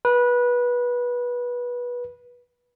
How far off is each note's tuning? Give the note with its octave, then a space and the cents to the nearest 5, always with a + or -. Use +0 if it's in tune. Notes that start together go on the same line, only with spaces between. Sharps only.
B4 -20